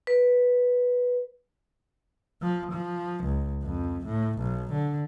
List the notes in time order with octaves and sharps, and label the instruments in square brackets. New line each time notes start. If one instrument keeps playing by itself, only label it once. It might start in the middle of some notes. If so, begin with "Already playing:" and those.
[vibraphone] B4
[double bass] F3
F3
C#2
F2
A2
B1
D3